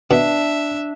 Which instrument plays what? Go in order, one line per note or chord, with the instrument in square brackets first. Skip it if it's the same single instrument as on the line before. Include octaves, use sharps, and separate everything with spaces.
[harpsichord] B2 [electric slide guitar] D4 [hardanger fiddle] E5